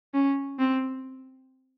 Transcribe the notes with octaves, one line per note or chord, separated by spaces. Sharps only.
C#4
C4